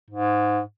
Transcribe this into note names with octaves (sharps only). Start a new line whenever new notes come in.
G#2